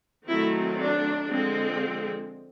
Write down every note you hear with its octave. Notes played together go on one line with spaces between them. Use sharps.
D#3 F#3 A3 C4 E4
D4
D3 F3 G#3 C4